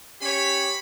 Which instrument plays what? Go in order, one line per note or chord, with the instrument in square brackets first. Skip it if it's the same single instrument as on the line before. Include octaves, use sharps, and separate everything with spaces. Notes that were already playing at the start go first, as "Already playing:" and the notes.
[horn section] C#4 G4 C#5 [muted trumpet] B5